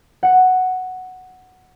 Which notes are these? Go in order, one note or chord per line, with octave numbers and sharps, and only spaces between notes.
F#5 C#7